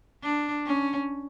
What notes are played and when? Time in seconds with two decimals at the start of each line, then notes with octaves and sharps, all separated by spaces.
0.23 D4
0.66 C#4